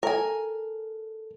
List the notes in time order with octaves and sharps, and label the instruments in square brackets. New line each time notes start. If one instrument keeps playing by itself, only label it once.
[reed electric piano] A4 [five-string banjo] A#4 G#5